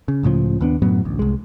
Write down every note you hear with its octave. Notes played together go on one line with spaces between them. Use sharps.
C#3
C#2 A2 C#3 F3
D#2 B3 D4
F#2 A2 F#3 B3
A1 D2
C2 G#3